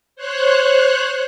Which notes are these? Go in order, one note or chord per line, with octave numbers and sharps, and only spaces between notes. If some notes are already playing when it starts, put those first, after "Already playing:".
C5 C#5 F#6